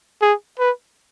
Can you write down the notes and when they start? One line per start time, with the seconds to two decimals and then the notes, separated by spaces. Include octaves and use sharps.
0.22 G#4
0.59 B4